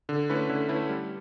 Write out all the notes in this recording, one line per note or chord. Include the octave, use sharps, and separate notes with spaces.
D3
A3 C#4 E4 B4
D3
A3 C#4 E4 B4
G3